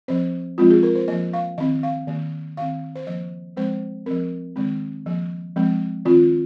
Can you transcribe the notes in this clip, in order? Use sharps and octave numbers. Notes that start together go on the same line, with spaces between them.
F3 C4 C5
F3 G#3 C4 F4
G#4
A#4
C5
F3 A#3 D#5
F5
D#3 C4 D#5
F5
D#3 A#3
D#3 C4 F5
C5
F3 A#3 D#5
F3 G#3 C4 C5
F3 C4 A#4
D#3 G#3 C4
F3 A#3
F3 G#3 C4
D#3 C4 F4